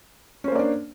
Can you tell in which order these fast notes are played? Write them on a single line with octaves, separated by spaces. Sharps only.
C#4 C5 A#3 D5 D4